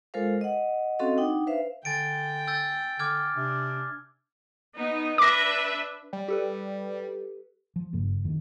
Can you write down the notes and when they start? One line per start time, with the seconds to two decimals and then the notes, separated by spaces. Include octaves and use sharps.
0.14 G#3 F4 A4 A#4 C5 F5
0.41 D#5 F#5
0.99 C4 C#4 F#4 A4 D#5 F5
1.18 D4 D#4 F#5 G5
1.47 B4 C5 E5 F5
1.85 D3 G5 G#5 A6 D7
2.48 E6 G6 A6
2.99 D3 D6 F6 G#6
3.35 C3 D4
4.75 B3 D#4
5.18 D4 B4 E5 D6 A#6
6.13 G3
6.28 G4 A4 B4
7.76 F3
7.93 F#1 G2 C#3 A#3
8.24 F2 D#3